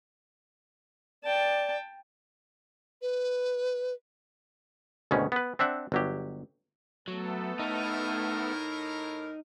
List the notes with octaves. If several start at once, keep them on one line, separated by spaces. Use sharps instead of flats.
D5 G5 A5
B4
D2 G#2 B2 D#3 C#4
B3 B4
C4 D4 E5 F#5
G1 F#3 G4
F#3 A3 B3 A4
A2 D#4 A#4